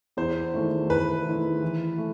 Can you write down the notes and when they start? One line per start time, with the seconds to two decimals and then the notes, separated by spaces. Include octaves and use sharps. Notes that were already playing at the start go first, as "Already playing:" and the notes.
0.17 E2 C5
0.54 D#3 A3 E4
0.89 E2 B4
1.26 D#3 A3 E4
1.62 E3
1.98 A3